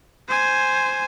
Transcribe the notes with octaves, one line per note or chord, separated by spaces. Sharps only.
C5 G#5